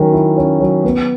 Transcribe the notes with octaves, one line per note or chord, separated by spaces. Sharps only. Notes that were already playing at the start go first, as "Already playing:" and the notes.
Already playing: D#3 F#3 C#4
E4
C#4
F#3
B3